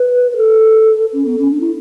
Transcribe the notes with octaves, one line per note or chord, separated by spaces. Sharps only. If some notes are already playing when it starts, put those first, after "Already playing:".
Already playing: B4
B4
A4
C#4
B3
C#4
D4
E4